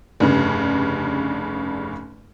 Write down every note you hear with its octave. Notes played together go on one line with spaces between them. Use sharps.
F1 G2 C#3